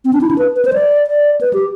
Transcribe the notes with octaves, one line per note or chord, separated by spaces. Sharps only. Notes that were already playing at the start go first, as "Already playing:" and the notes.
C4
D4
E4
D4
B4
B4
C5
D5
D5
B4
G4